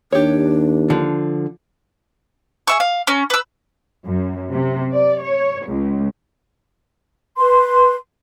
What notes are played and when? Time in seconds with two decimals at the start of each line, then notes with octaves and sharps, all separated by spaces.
0.12 D#2 D4 G4 C#5
0.90 D3 F3
2.67 G#4 E5 C#6
2.80 F5
3.07 C#4 A#5
3.30 B4 E6
4.05 F#2
4.53 C3
4.93 D5
5.22 C#5
5.68 C#2
7.38 B4 C6